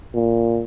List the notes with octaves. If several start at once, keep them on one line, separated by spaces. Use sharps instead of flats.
A#2